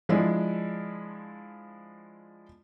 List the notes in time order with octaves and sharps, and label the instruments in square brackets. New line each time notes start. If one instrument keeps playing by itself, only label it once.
[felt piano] F3 G#3 D4 E4